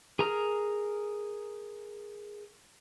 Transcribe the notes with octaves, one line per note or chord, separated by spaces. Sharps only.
G#4 A#4 A#5 D#6 F6